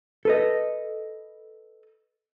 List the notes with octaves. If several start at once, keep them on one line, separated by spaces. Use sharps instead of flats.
A4 B4 D#5